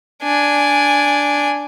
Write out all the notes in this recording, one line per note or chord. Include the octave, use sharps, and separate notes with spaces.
D4 G#5